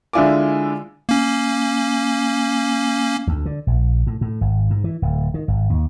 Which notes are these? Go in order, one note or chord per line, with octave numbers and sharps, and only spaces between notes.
D3 G#3 E4 F4 G#5 D6
A#3 C#4
D2
D3
A#1
A2
A2
G#1
G#2
E3
D1
D#3
G#1
D#2